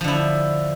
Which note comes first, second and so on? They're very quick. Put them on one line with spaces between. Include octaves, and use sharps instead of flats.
F3 D3 E4